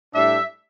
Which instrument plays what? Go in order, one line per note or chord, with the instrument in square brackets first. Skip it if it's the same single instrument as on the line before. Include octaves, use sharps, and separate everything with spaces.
[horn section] A2 G3 D4 E5